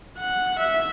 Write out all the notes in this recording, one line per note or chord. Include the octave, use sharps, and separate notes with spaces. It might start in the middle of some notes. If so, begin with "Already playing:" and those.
F#5
E5